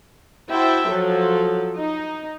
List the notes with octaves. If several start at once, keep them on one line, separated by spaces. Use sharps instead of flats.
E4 F#4 C5 E5 G5 A5
F3 F#3 A4
D#4